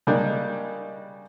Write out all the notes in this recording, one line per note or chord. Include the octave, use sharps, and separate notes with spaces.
C#3 G3 G#3 A#3 D4 D#4